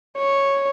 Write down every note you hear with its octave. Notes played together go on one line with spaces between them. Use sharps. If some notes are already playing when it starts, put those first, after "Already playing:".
C#5